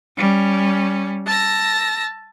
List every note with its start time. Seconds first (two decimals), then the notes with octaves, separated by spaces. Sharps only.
0.17 G3 C#4
1.27 A5 E6 A#6